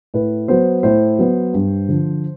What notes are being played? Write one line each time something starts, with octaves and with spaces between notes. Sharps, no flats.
A2 B4
F#3 B3 C5
A2 C5
F#3 B3
G2
D3 F3